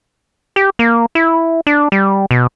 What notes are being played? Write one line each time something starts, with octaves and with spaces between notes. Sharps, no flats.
G4
A#3
E4
D4
G3
B2